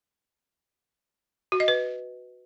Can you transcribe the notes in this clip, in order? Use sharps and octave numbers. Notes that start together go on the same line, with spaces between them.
F#4
D#5
B4